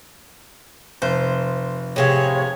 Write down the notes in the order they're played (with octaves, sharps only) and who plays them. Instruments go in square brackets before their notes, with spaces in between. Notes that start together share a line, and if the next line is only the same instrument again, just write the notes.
[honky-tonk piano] F1 [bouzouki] C5
[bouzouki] A2 C3 F5 [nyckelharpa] G#4 [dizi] C#5